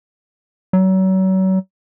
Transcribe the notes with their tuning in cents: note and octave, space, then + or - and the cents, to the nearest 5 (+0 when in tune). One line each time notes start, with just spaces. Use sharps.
F#3 +35